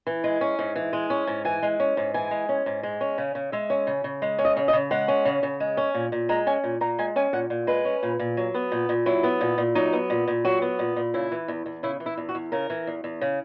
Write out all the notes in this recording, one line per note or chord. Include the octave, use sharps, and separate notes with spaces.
E3
G#3
C#4
G#2
E3
G#3
C#4
G#2
E3 G#5
G#3
C#4
G#2
E3 G#5
G#3
C#4
G#2
G#3
C#4
C#3
C#3
G#3 E5
C#4
C#3
C#3
G#3
C#4
D#5
C#3
D#5
C#3
G#3 F#5
C#4
C#3
C#3
G#3
C#4
A#2
A#2
G#3 A#5
C#4 G#5
A#2
A#2 A#5
G#3 G#5
C#4 G#5
A#2 F#5
A#2
G#3 B4
C#4
A#2
A#2
F#3
B3
A#2
A#2
F#3 E4
B3
A#2
A#2
F#3 D#4
B3
A#2
A#2
F#3 F#4
B3
A#2
A#2
C#3 E4
E3
E2
E2
C#3 E4
E3
E4
E2
F#4
E2
C#3 A#4
E3
E2
E2
C#3